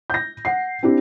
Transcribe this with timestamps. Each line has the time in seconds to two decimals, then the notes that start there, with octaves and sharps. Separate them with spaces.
0.10 G6 A#6
0.45 F#5 C7
0.83 C4 D4 E4 G4